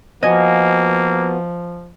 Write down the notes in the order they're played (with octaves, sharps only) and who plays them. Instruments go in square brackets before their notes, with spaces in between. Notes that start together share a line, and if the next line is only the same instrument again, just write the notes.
[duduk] F3 [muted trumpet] A#3 [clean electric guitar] B3 F#4 [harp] D#5 G#5